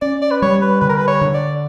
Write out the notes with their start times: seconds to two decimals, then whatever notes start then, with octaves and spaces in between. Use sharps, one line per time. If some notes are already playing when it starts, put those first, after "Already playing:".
0.01 C#4 D5
0.22 D5
0.31 B4
0.42 G3 C#5
0.62 B4
0.81 D3 B4
0.89 A#4
0.97 B4
1.08 C#5
1.21 D3
1.34 D5